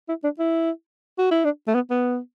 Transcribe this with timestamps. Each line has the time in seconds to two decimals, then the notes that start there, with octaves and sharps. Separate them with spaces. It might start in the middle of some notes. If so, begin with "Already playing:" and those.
0.09 E4
0.24 D4
0.39 E4
1.18 F#4
1.31 E4
1.45 D4
1.68 A3
1.75 B3
1.90 B3